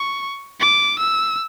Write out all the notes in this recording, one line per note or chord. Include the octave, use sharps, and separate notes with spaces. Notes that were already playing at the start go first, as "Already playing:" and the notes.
Already playing: C#6
D6
E6